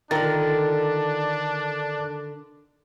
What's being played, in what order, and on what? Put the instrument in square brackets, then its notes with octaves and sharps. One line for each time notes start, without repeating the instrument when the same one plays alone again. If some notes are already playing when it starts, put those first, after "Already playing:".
[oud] D3 F4 [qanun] D#3 [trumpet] D4 [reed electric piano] A#4 A6